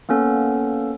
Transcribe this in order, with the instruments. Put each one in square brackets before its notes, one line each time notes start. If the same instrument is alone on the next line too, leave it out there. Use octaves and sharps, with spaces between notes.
[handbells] A#3 B3 C#4 A4